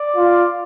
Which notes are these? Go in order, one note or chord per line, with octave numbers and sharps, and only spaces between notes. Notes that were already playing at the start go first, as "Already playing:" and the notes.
Already playing: D5
F4